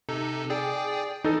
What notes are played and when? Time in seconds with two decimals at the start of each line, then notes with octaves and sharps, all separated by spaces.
0.09 C3 D#4 A4
0.50 G#4 D5 G5
1.24 E3 D#4 A4